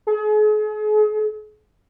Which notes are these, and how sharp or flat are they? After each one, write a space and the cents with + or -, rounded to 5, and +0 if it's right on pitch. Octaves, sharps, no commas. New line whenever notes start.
G#4 +40